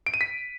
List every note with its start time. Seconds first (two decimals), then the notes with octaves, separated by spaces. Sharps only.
0.06 D7
0.14 D#7
0.21 B6